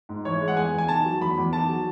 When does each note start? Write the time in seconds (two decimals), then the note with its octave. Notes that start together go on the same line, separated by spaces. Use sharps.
0.09 G#2
0.25 E3 C#5
0.41 G#3
0.48 F#5
0.57 E2 G#5
0.73 E2
0.78 G#5
0.88 D#3 A5
1.05 F#3
1.21 E2 B5
1.37 E2
1.53 D#3 A5
1.69 F#3